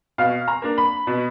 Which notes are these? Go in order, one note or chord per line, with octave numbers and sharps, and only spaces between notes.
B2 F5
A#5
A#3 D4
B5
B2